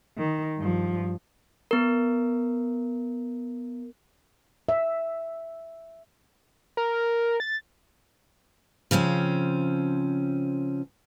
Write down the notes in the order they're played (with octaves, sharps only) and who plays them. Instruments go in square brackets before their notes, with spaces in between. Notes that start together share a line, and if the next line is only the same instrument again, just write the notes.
[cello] D#3
G2 F3
[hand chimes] B3 A#4
[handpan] E5
[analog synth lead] A#4
A6
[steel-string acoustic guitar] C#3 F3 C4 C#4